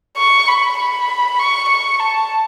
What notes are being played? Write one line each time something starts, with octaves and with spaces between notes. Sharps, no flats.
C#6
B5
B5
C#6
C#6
A5